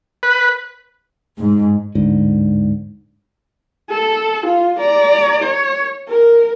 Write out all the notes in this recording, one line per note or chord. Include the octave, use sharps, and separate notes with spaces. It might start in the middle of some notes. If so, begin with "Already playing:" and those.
B4
G#2
D1 G#2 D3
A4
F4
D5 A#5
C#5
A#4